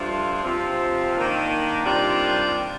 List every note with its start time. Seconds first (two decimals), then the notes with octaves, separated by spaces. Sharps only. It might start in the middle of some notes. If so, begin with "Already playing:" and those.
Already playing: G2 F3 A3 D4 F4
0.44 C3 F3 C4 F4
1.14 D#3 A#3 D4
1.85 C3 D#3 G3 D4 F4